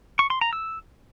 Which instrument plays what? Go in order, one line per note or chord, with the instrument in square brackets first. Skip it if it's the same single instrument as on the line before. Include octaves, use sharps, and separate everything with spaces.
[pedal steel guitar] C#6
C6
A#5
E6